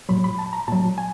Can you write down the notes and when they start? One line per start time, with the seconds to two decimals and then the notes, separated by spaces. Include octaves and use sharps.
0.09 A#2 F#3 B5
0.24 B5
0.39 A5
0.53 A#5
0.68 A#2 F#3 A5
0.98 G#5